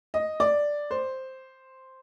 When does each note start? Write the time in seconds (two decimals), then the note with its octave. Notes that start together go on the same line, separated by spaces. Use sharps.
0.14 D#5
0.40 D5
0.91 C5